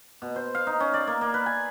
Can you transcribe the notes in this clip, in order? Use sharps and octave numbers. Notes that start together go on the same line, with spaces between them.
B2
C5
F5
D#4
C#4
D5
A#3
A#3
B4
G#5